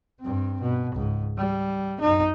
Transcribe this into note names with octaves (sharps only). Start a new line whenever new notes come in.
G2 C4
B2
C#2 G#2
G3
F#2 D#4